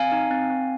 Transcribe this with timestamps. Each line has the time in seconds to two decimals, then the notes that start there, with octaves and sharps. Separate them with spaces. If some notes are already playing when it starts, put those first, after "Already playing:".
Already playing: C4 F5 G#5
0.12 D#4
0.31 C4
0.50 C4